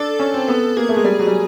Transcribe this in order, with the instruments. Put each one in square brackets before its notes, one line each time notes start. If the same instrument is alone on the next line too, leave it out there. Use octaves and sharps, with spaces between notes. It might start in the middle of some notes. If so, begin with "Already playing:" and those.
Already playing: [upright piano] D4 [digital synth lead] A4
[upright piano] C#4
C4
B3
[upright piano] A#3 [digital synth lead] G#4
[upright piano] A3
G#3
G3
F#3
G3